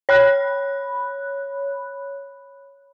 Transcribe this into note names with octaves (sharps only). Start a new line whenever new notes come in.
C#5 B5 F#6